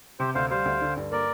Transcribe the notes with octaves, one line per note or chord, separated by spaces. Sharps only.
C3 G4 C5
D2 C5 F5
G3 C5 F5
D2
D3
G2
A#3 A#4 D5